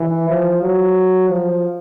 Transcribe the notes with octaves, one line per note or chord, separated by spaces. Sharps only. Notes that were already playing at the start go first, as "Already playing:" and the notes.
Already playing: E3
F3
F#3
F3